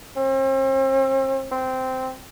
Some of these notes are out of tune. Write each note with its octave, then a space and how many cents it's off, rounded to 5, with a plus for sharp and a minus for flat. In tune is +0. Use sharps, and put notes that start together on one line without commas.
C4 +40
C4 -10